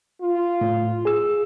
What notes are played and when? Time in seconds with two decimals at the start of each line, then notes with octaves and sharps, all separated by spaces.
0.22 F4
0.61 A2
1.05 G#4 E6